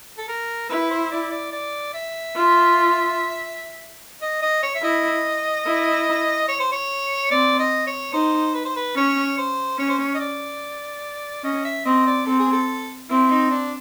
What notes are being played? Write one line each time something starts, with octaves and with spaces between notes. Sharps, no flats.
A4
A#4
E4 B4
C5
D5
D5
D5
E5
F4
D#5
D#5
C#5
E5
E4 D#5
E4
C#5
C5
C#5
C4 D5
D#5
C#5
D#4 C5
B4
C5
B4
C#4 C#5
C5
C#4 C#5
C5
C#5
D#5
D5
C#4 D#5
E5
C4 D#5
D5
C4 A4
G#4
A4
C4 E4
D#4
D4